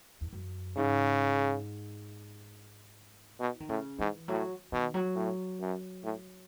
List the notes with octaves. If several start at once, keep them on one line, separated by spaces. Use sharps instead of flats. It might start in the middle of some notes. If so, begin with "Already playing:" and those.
E2
F#2
G#2 C#3
B2
E3
D#3
A2 C#3
G#2 E3
A2 F#3
B2 D#3
F#3
A2
F#2
A2